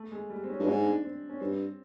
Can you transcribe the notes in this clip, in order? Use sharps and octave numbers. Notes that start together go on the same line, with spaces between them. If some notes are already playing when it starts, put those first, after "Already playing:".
Already playing: A3
G#3
G3
C4
C#4
G2
G#2 D4
D4
C4
C#4
G2 C4